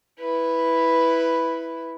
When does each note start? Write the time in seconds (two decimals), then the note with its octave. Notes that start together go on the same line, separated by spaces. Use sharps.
0.21 E4 B4